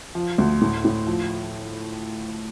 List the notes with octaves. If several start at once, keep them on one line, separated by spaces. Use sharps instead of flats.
F3
D2
A2
A2
F3